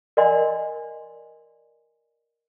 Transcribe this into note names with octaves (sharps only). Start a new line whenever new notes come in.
A#4 D5 D#5 F#5 G#5 C6